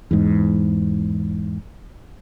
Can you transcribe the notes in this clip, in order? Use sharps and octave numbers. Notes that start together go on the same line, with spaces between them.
E2 G#2